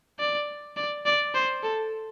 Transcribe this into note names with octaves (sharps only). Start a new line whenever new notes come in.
D5
D5
D5
C5
A4